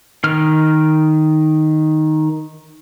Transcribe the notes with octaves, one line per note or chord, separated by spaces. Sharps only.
D#3 F6